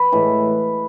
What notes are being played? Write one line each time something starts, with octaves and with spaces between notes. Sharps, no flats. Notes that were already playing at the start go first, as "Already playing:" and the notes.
Already playing: B4
A2 E3 G#3